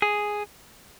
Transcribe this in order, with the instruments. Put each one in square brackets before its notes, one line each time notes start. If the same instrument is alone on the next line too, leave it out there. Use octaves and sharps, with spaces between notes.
[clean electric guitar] G#4